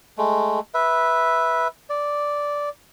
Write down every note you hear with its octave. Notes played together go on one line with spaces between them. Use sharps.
G#3 A3
B4 E5
D5